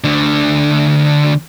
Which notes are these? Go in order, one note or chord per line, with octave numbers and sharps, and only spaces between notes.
D2 D3